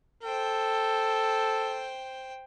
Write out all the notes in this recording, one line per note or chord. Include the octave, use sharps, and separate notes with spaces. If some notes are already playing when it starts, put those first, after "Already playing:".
A4 C5 G5